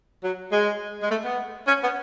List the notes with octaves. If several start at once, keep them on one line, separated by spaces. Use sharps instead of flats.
F#3
G#3
G#3
A3
B3
C#4
B3